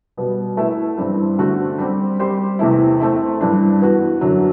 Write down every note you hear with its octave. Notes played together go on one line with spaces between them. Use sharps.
B2 G3 B3
A3 E4 B4 E5
G2 E3 G3 C4
D3 A3 C4 F#4
G3 C4 G4
G3 C4 G4 C5
E2 C3 E3 A3 E4
A3 C4 E4
G2 E3 G3 D4
E3 B3 F#4
F#2 D3 F#3